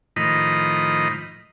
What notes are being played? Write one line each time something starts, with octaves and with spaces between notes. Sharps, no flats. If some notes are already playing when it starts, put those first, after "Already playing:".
A2 D#3 F3 D#5 A#5 B5